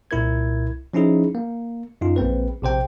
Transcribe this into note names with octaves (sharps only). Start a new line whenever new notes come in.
C2 A#2 E4 A#4 G#6
F3 C#4 D#4 E4 G#4
A#3
F#2 D#4 F4
A#1 A#3 C4 B4
A#1 C3 C5 G5